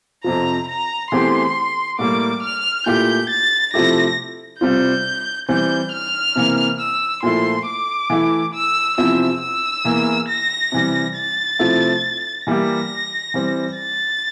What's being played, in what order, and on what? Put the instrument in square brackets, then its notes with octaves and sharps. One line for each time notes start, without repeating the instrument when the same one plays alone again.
[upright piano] F2 C3 F3 [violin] A#5
[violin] A#5
[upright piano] E2 E3 A3 C4 G4 [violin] C6
[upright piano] A2 G3 A#3 [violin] D6
[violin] F6
[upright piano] A#2 A3 E4 G4 [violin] G6
[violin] A6
[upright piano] C3 F3 A3 E4 G4 [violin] A#6
[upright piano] C3 G3 C4 F4 [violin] G6
[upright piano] E3 G3 C4 [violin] G6
[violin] F6
[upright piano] C3 E3 A#3
[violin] E6
[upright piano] A#2 F3 A3 E4 [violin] C6
[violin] D6
[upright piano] E3 A3 E4
[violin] E6
[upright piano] E2 C3 F3 C4 E4 [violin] E6
[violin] E6
[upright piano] E2 E3 A#3 E4
[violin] A#6
[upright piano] C3 E3 G3
[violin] A6
[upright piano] C3 F3 A3 E4
[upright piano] E3 G3 A#3 E4 G4 [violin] A#6
[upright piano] E3 G3 C4
[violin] A6